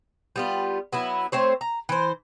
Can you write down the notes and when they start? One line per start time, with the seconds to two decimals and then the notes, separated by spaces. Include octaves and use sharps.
0.36 G3 B3 F4
0.93 F#3 B3 E4
1.32 A3 C4 C5 C#5
1.61 A#5
1.89 E3 C5